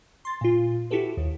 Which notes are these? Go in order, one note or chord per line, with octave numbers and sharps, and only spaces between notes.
C6 A6
A#2 F4
E4 F#4 G4 A4 B4
D#2